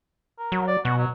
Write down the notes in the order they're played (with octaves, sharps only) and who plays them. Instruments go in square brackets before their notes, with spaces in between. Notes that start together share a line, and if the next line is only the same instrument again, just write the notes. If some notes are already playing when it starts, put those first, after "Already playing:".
[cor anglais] A#4
[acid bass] F#3
[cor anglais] D5
[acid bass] B2 [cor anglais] F#4
[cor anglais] F#3